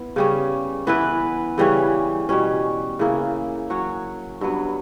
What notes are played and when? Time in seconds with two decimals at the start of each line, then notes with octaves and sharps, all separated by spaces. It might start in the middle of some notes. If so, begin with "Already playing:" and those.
Already playing: B3 E4
0.16 C#3 G3 C#4
0.87 E3 B3 E4 B4
1.58 C#3 E3 G3 C#4
2.29 B2 G3 C#4
2.99 C#3 E3 A#3 E4
3.70 F#3 C#4 F#4 C#5
4.41 G2 F#3 B3